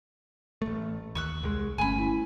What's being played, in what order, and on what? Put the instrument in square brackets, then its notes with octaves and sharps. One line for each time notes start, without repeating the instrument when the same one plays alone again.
[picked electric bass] A1 A3
[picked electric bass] D#2 [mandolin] C#6 E6 F#6
[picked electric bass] C2 G#3
[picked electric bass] G1 [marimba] A3 C#4 [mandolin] G#5 B5
[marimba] E4